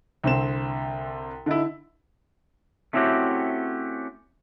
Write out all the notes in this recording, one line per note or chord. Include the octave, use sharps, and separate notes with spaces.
C2 D3 C4 E7
D3 D#4 E4
A3 C4 C#4 E4 F#4 G4